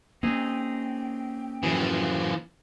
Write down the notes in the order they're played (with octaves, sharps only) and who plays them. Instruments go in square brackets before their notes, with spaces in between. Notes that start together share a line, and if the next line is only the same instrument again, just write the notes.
[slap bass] A#3 C#4 [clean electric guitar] C4 D#4 G#4 [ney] G5
[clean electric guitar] F#2 A2 G#4 [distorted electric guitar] E3 F3